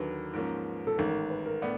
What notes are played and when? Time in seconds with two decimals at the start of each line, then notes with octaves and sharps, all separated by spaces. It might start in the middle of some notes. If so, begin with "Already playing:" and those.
Already playing: D#2 D3 F#3 A#3 B4
0.33 G#2 F3 A#3 C#4
0.87 A4
0.98 A1 G#2 D#3 A#4
1.08 A#4
1.30 B4
1.46 A#4
1.62 A2 B3 D4